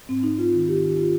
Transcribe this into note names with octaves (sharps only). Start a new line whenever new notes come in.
G#2 C4
G#2 D#4
G#2 F4
D#3
D#3 G4
D#3
F4